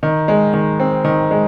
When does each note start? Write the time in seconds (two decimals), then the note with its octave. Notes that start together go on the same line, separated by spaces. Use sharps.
0.03 D#3
0.28 G#3
0.53 D#3
0.80 C4
1.05 D#3
1.31 G#3